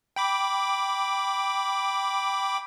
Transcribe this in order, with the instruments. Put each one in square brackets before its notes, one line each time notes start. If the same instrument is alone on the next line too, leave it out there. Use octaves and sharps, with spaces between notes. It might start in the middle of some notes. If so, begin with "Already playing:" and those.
[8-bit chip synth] G5 B5 D6